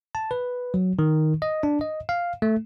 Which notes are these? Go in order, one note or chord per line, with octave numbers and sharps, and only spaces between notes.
A5
B4
F#3
D#3
D#5
D4
D#5
F5
A3